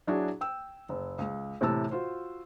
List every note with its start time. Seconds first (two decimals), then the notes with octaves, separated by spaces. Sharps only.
0.07 F#3 D4 E4 F#4 G#4
0.41 G5 E6
0.89 F#1
1.19 C#2
1.61 A2 C3 E3 A5 E6
1.91 F4 F#4 C5